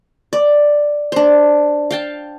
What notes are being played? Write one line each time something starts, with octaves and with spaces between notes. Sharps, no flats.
D5
D4 C5
F5 G5 A5